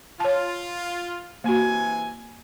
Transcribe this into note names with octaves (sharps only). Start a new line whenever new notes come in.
F4 C#5 A5
C3 E3 A#3 F#4 G#5